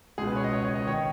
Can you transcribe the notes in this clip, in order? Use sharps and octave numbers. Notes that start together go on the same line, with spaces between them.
C#2 B2 G#4
B4
C#5
D#5
C#5
C#5
D#5
D#3 C#5